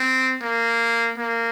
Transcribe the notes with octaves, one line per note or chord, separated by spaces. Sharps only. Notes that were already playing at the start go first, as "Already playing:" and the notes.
Already playing: C4
A#3
A#3